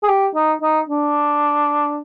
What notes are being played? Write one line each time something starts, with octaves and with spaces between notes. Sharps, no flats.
G#4
G4
D#4
D#4
D4